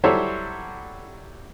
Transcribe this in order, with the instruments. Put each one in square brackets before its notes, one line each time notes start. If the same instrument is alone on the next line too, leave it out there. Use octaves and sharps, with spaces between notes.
[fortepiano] F#3 G3 E4 A4 C5 C#5